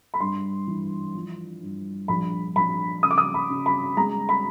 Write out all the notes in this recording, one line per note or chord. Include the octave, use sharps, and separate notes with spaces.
B5
G2 C6
E3
F3
G2
A#1 B5
A#1 B5
C#3 D#6
D6
D#6
B5
C#3
B5
G#3 A#5
B5